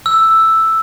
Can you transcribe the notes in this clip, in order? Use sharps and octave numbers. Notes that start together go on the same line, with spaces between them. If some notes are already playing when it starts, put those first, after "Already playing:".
E6